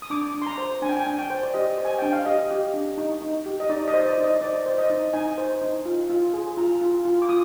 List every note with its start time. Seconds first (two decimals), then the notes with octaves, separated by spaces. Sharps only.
0.02 D#6
0.10 D4 D6
0.34 D4
0.42 C6
0.46 A#5
0.58 C5
0.82 D4 G#5
0.89 G5
0.97 G#5
1.06 D4
1.19 G5
1.30 C5
1.43 D5
1.54 G4 D#5
1.78 C5
1.85 G#5
1.98 D4 G5
2.13 F5
2.25 G4 D#5
2.51 G4
2.74 D4
2.98 D#4
3.22 D#4
3.46 G4
3.60 D#5
3.69 D#4 D5
3.88 D#5
3.94 C5
4.06 D5
4.18 D#4
4.24 D#5
4.41 C5 D5
4.66 C5
4.78 D#5
4.90 D#4
5.13 D#4 G#5
5.38 C5
5.62 D#4
5.85 F4
6.09 F4
6.34 G#4
6.57 F4 A#5
6.81 F4
7.05 F4
7.22 D6
7.29 F4 D#6